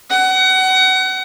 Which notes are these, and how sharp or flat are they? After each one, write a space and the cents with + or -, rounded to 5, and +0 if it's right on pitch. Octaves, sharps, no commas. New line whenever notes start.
F#5 +30